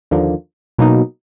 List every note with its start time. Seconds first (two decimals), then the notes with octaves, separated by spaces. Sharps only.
0.11 D#2 D3 F3 A#3
0.78 B2 F#3 A#3 D#4